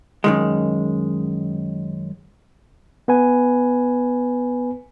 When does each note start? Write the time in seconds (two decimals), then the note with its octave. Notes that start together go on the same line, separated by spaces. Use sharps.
0.24 F#2 D#3 G#3
3.08 B3 B4 G#5